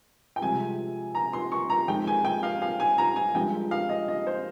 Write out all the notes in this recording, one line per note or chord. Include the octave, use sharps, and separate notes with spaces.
G5
C2 C3 F3 G#3 G#5
A#5
C6
C#6
A#5
F2 D#3 G#3 G5
G#5
G5
F5
F5
G#5
A#5
G#5
G2 F3 G#3 G5
F5
D#5
D#5
C5